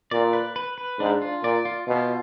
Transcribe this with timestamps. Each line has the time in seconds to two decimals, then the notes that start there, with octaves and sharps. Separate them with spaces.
0.11 A#2 D5
0.33 B4
0.56 B4
0.78 B4
0.99 G#2 D4
1.22 F4
1.44 A#2 D5
1.65 F4
1.87 B2 F4